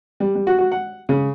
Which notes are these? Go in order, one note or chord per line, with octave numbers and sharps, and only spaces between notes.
G3
G3
F#4
F#4
F#5
C#3